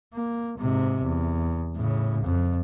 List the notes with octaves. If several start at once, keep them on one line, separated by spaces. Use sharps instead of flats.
A#3
G#2 C3
E2
A2 C#3
F2